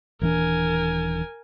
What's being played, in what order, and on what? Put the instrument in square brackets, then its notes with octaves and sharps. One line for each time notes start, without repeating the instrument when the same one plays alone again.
[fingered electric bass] D#1 E3 D4 [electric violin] A#4 G#5